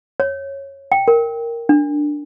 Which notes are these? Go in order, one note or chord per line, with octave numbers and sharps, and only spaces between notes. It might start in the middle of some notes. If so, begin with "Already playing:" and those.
C#5
G5
A#4
D4